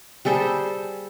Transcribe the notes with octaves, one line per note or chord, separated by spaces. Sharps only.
G3 G#4 A4 C5